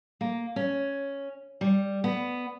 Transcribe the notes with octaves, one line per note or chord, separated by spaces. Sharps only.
A#3
C#4
G3
B3